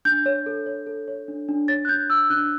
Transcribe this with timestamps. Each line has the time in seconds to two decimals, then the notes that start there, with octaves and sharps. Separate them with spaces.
0.05 D4 G6
0.26 C#5
0.46 A4
0.66 C#5
0.87 A4
1.08 C#5
1.28 D4
1.48 D4
1.68 C#5 A6
1.85 F#6
1.89 D4 G6
2.10 D4 E6
2.30 D4 F#6